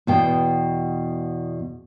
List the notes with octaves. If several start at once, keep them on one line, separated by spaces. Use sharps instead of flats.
E2 B2 G5